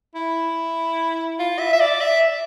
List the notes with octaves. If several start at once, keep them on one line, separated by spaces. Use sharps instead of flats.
E4
F4
E5
E5
D5
E5